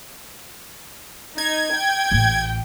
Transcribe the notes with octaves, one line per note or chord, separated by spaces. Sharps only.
D#4 G#6
G5
A1 A2